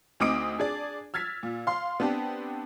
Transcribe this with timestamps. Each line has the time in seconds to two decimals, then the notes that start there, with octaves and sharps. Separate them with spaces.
0.20 D2 C4 D#4 D6 D#6 D7
0.58 D4 G#4 D5
1.14 E6 F6 G#6 A6 B6
1.43 A#2
1.67 F5 C6
2.00 B3 C4 D4 G4